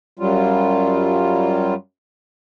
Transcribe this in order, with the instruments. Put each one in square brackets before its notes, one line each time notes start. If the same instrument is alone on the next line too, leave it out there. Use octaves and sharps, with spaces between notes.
[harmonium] F#2 F#3 G3 F4